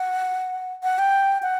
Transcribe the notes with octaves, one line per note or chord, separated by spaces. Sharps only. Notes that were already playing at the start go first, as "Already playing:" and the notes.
Already playing: F#5
F#5
G5
F#5